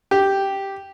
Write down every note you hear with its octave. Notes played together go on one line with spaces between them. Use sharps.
G4